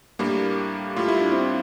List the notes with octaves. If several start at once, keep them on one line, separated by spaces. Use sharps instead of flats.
A2 G3 A#3 D4
A2 G3 F4
E4
D4
C4 E4